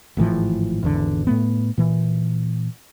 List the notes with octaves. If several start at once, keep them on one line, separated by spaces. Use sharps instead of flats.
G#1 A2 E3 F3
G#1 E2 D3
A2 A3 B3
A#2 E3